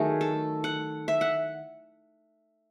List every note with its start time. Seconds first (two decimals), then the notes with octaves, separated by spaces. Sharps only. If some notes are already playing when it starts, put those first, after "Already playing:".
Already playing: D#3 F#3 A3 G#4
0.21 A4
0.64 F#5
1.08 E5
1.21 F#5